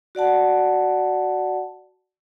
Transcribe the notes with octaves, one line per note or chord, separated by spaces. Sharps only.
F#4 D5 F#5 A5